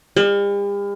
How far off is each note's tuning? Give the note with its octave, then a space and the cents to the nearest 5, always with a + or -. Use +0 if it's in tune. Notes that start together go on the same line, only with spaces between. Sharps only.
G3 +45